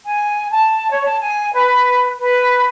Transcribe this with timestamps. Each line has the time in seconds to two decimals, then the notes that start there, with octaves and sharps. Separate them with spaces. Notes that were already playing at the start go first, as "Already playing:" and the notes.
0.05 G#5
0.50 A5
0.90 C#5
1.05 A5
1.20 G#5
1.54 B4
2.21 B4